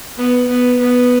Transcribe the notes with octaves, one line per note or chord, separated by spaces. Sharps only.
B3
B3
B3